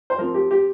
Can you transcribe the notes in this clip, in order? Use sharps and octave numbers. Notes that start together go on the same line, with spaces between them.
C5
F3 C4 A#4
G4
G4